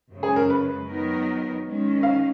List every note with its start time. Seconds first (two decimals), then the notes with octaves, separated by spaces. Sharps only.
0.11 F#2 C#3 G#3
0.23 G#4
0.36 A#4
0.50 B4
0.88 D#3 F#3 B3 D#4 A#4
1.64 D#3 G#3 C#4
2.03 F5